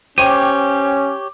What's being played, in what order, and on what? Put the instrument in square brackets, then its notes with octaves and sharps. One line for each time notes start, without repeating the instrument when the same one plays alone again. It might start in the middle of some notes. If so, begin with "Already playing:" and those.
[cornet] C#4 [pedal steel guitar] G4 C#5 [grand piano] C5 G5 D6 [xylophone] D#7